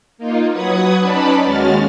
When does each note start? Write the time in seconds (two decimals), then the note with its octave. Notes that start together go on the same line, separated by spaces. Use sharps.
0.18 A#3 D#4 F4
0.50 F#3 B4 F#5 D#6 G#6
0.99 C#4 D#4 B4 D5 A5 B5
1.44 D#2 G#3 C#4 F#4 F6 A6